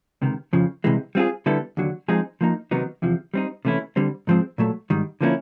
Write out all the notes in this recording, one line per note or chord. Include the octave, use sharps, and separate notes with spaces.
C#2 C3 D#3
F2 C#3 F3
C2 C3 E3 G#3
G3 C4 F4 G#4
D3 G3 B3 E4 A4
D#2 D3 F#3
F3 G#3 C4 D#4 G#4
F3 A#3 D#4
C3 D#3 F#3 B3 D#4
E2 C3 F3
G3 C4 D#4
C3 E3 A3 C#4 E4
D3 G3 C4
G#2 F3 G#3 C4
A#2 F#3 A3
G#2 D#3 G3
D3 F3 A#3 C#4 E4